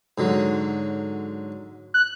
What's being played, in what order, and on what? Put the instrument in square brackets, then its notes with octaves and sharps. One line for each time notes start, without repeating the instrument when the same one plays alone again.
[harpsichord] G#2 D3 F#3
[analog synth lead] F#6